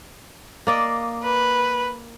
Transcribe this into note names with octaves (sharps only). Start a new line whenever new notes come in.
A#3 D5 D#5
B4